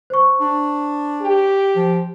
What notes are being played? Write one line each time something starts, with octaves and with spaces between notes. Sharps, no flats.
C5 C#6
D4
G4
F3